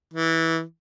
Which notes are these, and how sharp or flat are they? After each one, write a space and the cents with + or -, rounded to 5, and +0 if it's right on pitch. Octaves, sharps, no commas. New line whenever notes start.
E3 -15